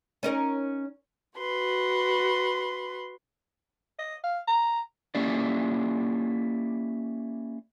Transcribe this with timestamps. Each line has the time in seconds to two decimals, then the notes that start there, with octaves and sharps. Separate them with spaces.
0.23 C#4 D#4 A#4
1.37 F#4 B4 C6
3.99 D#5
4.24 F5
4.47 A#5
5.15 A#3 C#4 E4 G4 D5